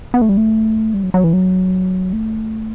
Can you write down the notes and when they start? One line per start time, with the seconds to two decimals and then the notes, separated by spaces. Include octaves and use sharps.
0.14 B3
0.22 A3
0.29 G3
0.37 A3
0.94 G3
1.03 F#3
1.14 F#3
1.24 E3
1.33 F#3
2.13 A3